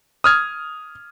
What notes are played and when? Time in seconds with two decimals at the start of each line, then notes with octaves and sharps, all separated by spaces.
0.24 D#6 F6 G#6